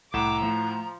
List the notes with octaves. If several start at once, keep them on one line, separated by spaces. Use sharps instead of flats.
C2 A2 F#5 A#5 D6 E6 E7
F3 A3